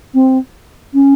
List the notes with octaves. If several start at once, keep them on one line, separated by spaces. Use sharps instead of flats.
C4
C#4